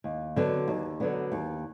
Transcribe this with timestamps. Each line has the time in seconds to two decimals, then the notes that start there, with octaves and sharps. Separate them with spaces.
0.04 D#2
0.36 D3 F#3 B3 D4
0.68 D#2
1.00 D3 F#3 B3 D4
1.32 D#2